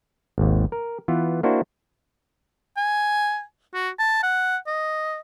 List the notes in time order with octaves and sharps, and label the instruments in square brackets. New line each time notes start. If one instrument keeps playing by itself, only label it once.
[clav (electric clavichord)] G#1 D#2
A#4
E3 B3 F4
A#3 D4 E4 F#4 C5
[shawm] G#5
F#4
A5
F#5
D#5